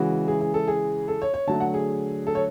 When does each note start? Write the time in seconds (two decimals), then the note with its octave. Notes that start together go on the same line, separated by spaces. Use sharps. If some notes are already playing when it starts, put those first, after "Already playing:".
Already playing: C#3 E3 G#3 F#4
0.28 G#4
0.41 G#4
0.54 A4
0.68 G#4
1.08 A4
1.22 C#5
1.34 C#5
1.47 D3 F#3 A3 A5
1.60 F#5
1.74 G#4
2.27 A4
2.35 C#5